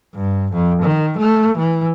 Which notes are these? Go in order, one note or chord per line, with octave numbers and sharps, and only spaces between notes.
G2
F2
D#3
A3
E3